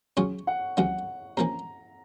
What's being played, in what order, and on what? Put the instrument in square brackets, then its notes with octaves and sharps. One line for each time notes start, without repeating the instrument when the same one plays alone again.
[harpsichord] C#3 F#3 C#4 F4 [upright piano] C#6
[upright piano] F#5
[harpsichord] C#2 C3 F#3 C#4 [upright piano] F#5
[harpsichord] C3 F3 A#3 C#4 [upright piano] A#5